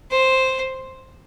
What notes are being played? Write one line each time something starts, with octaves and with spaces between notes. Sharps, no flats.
C5